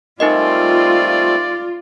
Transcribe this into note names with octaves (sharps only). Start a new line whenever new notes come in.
G3 A3 C4 D#4 F4 A#4 D5 D#5